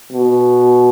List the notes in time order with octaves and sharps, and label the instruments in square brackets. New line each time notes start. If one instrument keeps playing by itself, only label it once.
[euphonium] B2